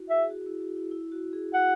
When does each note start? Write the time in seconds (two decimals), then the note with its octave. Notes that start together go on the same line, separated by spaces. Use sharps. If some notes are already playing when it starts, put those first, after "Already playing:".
Already playing: E4 F#4
0.10 G#4 E5
0.23 G#4
0.31 F#4
0.41 F#4
0.46 E4
0.61 F#4
0.76 E4
0.91 E4
1.12 F#4
1.33 G#4
1.54 F#4 F#5